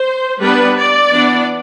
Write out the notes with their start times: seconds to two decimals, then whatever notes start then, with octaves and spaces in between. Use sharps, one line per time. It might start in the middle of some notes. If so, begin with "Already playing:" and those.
Already playing: C5
0.40 G3 B3 D4 B4
0.77 D5
1.13 E3 B3 D4